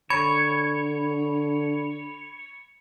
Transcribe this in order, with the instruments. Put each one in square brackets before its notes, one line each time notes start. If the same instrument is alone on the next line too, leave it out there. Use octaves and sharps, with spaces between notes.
[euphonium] D3 [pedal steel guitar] C#5 [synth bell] B5